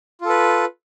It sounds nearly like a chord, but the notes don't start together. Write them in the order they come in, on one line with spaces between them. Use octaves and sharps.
F4 A4 B4